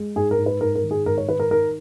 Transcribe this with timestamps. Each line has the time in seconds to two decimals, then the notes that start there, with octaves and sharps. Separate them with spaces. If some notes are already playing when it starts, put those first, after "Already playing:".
Already playing: G#3
0.16 G#2 G#4
0.31 A#4
0.38 G#2
0.46 B4
0.61 G#2 A#4
0.76 A#4
0.84 D#3
0.91 G#4
1.06 G#2 A#4
1.18 C#5
1.29 D#3 B4
1.40 A#4
1.51 D#3 A#4